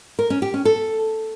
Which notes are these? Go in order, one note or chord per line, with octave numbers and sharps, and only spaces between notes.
A#4
C#4
G4
C#4
A4